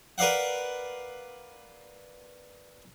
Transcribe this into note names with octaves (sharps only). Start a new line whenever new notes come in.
A#4 B4 D5 F5 F#5